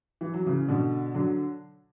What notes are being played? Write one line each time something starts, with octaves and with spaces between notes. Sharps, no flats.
E3
F#3
C#3 E3
B2 D3
D3 F#3